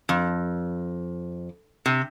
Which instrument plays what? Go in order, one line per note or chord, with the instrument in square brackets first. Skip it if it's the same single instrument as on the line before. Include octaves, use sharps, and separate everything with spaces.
[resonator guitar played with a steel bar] F2
C3